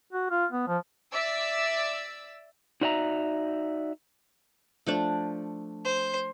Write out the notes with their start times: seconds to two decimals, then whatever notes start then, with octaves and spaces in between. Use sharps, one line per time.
0.13 F#4
0.30 F4
0.52 B3
0.67 F3
1.12 D5 E5 E6
2.81 D#4 F#4 D5 E5 G5 A#5
4.86 F3 A3 D4
5.85 C5